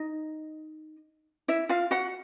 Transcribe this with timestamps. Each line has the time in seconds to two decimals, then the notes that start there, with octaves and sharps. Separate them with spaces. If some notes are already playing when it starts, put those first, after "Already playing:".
Already playing: D#4 D#5
1.48 E4 E5
1.69 F4 F5
1.91 F#4 F#5